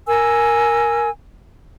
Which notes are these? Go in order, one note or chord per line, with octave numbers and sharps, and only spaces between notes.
A#4 G#5 E6